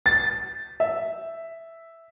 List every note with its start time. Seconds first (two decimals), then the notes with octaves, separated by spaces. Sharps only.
0.06 A6
0.80 E5